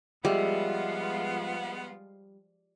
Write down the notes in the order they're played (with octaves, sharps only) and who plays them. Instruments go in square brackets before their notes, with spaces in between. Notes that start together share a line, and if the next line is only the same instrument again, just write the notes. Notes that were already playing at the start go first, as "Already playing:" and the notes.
[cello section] F3 G#3 F4 [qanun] G3 [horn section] B3 [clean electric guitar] G#4 D#5 E5